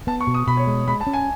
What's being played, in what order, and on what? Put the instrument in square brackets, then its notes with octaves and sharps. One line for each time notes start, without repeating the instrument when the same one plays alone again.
[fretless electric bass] B3 [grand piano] A5
[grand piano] C#6
[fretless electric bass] B2
[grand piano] D#6
[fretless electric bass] B2 [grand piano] B5
[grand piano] C#5
[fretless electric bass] G#3
[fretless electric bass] G#3 [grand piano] B5
[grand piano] A5
[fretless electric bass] C#4
[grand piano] G#5